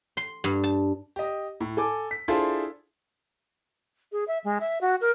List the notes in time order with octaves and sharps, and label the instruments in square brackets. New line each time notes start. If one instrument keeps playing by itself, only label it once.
[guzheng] C6
G2
A5
[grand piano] G4 D#5
A2
A4 G#5 D6
B6
D4 E4 F4 G#4 A4 C5
[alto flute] G#4
E5
G#3
E5
F#4
A#4